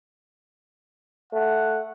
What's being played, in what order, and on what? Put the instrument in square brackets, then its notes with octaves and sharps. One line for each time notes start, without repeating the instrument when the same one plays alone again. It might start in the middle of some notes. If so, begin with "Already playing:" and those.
[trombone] A3 [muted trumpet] F#5